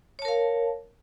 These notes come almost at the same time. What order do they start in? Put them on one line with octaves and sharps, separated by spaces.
C#5 A5 A#4 F5